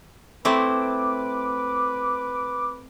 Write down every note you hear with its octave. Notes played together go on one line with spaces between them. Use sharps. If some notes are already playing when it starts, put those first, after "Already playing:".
A3 C4 E4 B4 D6